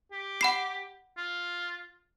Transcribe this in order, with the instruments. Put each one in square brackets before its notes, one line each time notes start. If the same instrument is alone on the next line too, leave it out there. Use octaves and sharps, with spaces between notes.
[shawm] G4
[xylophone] F#5 B5 C7
[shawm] F4